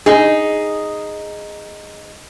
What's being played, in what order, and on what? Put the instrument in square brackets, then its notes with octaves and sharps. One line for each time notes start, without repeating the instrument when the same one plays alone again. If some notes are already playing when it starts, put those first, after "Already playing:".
[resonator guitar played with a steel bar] D#4 G#4